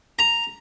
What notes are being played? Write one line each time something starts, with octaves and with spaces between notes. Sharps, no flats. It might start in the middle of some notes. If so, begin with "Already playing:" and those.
A#5